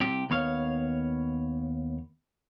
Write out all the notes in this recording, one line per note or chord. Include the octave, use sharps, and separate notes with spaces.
C2 C3 G4
D#2 B3 C#5 F5